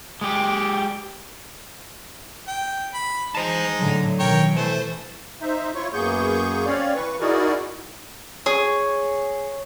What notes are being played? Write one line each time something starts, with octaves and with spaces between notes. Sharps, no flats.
G#3 G4
G5
B5
G#3 D#4 C5 A5
A2 D3 F#3
B2 D#3 A#4 C#5 G5
E3 A3 C5
D#4 C5 E5
E4 F4 C#5 C#6
F#2 A#3 B3 G#4 C#6 G6
C4 C#4 C#5 D5 F5
E3 B4 C#6
D#4 E4 F#4 G#4 A#4 D5
G#4 C#5